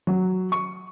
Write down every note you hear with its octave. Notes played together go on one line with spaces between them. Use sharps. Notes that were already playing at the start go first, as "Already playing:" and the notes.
F#3
C#6